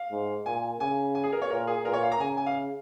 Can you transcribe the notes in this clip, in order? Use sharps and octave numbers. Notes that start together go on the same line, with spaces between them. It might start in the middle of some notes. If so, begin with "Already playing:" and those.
Already playing: F5
G#2
A#2 G#5
C#3 G#5
G#5
G#4
A#4
C#5
A#2 A#4
G#4
A#2 A#4
C#5
F5
A#5
C#3 G#5
G#5
F5